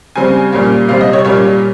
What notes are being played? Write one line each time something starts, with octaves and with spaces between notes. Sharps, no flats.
C#3 G3 C4 G#5
A#2 G3 A#3 C#4
C3 G3 C4 F5
D#5
C#5
A#2 G3 A#3 C#4 C#5